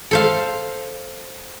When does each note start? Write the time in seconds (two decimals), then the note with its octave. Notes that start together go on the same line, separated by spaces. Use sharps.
0.11 A4 C5 F5